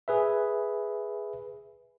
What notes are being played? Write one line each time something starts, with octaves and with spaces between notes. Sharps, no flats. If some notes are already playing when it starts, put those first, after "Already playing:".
G#4 B4 E5